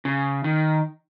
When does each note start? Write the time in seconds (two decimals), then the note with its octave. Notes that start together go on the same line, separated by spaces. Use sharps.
0.05 C#3
0.44 D#3